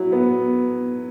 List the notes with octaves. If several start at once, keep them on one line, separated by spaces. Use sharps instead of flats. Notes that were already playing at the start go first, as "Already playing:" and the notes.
Already playing: F#3 E4
B3